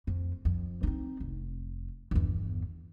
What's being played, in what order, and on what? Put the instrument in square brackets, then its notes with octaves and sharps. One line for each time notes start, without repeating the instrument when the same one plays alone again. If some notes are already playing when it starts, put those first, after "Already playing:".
[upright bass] F2
F2
C4 D#4
F1
G1 E2